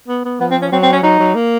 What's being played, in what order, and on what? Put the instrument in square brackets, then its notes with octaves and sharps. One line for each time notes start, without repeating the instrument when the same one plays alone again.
[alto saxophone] B3
B3
[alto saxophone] F3 [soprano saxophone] B3
[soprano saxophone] C4
C#4
[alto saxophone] F#3 [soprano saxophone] C4
[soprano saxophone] C4
C#4
[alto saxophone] F#3 [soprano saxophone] D#4
[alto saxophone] F#3
A#3